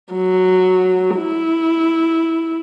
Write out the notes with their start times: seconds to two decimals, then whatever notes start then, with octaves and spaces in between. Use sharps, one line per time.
0.14 F#3
1.17 E4